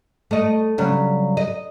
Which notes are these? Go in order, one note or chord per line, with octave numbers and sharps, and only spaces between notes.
A3 D#5
C#3 F#3 G3
D#5